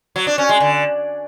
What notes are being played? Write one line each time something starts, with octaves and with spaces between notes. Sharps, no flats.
F#3
D4
C#4
G#3
D3